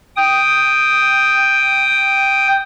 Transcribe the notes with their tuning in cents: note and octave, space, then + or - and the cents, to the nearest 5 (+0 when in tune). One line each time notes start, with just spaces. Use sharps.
G5 +0 D#6 +0